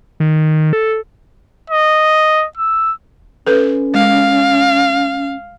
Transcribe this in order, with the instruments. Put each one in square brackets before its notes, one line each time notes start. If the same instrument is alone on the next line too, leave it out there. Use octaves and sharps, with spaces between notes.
[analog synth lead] D#3
A4
[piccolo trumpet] D#5
E6
[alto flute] C#4 [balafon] A4 B4
[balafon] G#3 [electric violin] F5